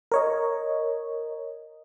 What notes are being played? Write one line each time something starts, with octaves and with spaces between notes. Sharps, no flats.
A#4 C#5 D#5